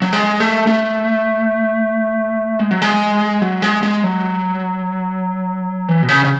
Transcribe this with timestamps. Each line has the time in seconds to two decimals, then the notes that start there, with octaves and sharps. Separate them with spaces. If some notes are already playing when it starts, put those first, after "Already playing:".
0.02 F#3
0.13 G#3
0.40 A3
0.67 A3
2.59 G#3
2.71 F#3
2.82 G#3
3.42 F#3
3.62 G#3
3.83 G#3
4.04 F#3
5.88 E3
6.03 B2
6.08 C#3
6.25 C#3